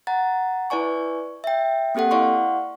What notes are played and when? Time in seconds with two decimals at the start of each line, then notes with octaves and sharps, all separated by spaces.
0.07 F#5 A#5 A6
0.70 E4 B4 D5 G#5 C#6
1.44 E5 G5
1.95 A#3 C4 G4 A4 F#5
2.11 E4 D5 F5 F#5 C6 C#6